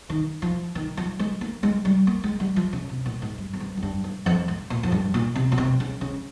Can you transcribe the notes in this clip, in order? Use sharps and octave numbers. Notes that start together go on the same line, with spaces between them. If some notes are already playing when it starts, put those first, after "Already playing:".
D#3
F3
D#3
F3
G#3
A#3
G#3
G3
A#3
G#3
G3
F3
C#3
C3
A#2
G#2
G2
F2
G2
F2
G2
G2
F2
G#2
A#2
F2
G2
A#2
C3
A#2
C3
C#3
C#3